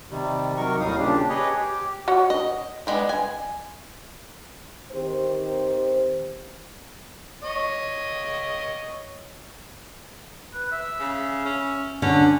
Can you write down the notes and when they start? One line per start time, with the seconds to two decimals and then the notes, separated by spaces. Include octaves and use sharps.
0.11 C3 D#3 G3
0.57 C3 D#3 F#3 A#4 C#6
0.80 D#2 A2 G3 D#4 F5 D#6
0.98 A#2 C#3 D4 G4
1.29 G4 G#4 B4 C#5 D#5
1.61 G4
2.08 F#4 C#5 F#5
2.30 D#5
2.87 G3 G#3 B3
3.09 G#5
4.92 D#3 C4 G4 C5
7.43 C#5 D#5 D#6
10.54 B4
10.72 E5
11.00 C#3
11.45 C#4
12.02 D3 C#4